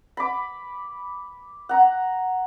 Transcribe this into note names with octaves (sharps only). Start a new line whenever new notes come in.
B5 D6
F#5 A#5